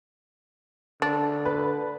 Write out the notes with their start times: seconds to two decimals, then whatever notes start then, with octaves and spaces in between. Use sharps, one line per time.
1.02 D3 D4
1.45 B4